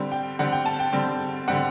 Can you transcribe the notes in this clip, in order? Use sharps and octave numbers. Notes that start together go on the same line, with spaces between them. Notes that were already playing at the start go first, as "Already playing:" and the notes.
Already playing: D3 G3 C4
G5
D3 G3 C4 F#5
G5
A5
G5
D3 G3 C4
D3 G3 C4 F#5